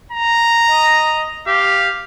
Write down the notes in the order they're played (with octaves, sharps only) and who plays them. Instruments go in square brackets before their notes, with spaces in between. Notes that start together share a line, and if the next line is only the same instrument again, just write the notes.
[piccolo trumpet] A#5
[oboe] D#5
[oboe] G4 [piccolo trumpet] F5